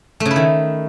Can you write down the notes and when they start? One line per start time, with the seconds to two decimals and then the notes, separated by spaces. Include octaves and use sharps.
0.20 A3
0.25 C#3
0.31 E4
0.36 D#3